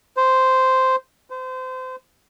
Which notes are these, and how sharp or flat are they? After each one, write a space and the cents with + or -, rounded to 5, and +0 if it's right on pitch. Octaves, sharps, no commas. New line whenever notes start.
C5 -5
C5 -30